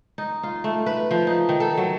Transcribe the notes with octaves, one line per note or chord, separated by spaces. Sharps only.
D#4
F4
A3
B4
F3
D#4
D#3
A4
F#3